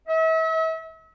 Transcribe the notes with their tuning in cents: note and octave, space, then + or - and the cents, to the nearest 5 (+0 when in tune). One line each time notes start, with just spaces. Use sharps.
E5 -40